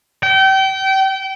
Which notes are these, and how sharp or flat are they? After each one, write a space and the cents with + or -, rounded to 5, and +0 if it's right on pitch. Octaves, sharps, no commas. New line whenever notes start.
G5 -30